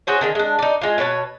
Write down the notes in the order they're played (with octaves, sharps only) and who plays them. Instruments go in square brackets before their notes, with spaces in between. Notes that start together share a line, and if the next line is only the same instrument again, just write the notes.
[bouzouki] F#4 G#4 C5 C#5
D3 D#3 G#4
G#3 D4
D#4 D5
G#3 F4
B2 B4 C#5 A5